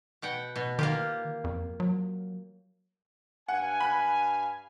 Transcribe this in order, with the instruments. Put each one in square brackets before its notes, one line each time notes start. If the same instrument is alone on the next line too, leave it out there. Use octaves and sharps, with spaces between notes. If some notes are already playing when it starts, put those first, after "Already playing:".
[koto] B2 F#5 G5
B2
[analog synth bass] D#3 [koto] A#3 F4 G4
[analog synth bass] F2
F#3
[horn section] G2 F5 G#5 [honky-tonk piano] F#5
[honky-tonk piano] B5 F#6